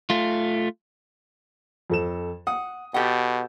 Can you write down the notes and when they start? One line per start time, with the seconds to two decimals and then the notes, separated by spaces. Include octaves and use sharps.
0.10 A3 F4
1.90 F2 A4 E7
2.47 F#5 D#6
2.94 B2 G4 A4 F#5